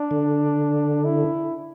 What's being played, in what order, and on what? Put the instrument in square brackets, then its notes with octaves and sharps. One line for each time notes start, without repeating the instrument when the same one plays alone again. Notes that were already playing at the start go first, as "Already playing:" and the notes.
Already playing: [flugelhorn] D4
[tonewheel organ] D3
[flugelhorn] E4